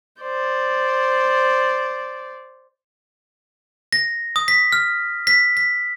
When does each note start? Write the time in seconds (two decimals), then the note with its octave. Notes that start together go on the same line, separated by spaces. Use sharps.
0.21 C5 D5
3.93 A#6
4.36 D#6
4.48 B6
4.72 F6
5.27 B6
5.57 B6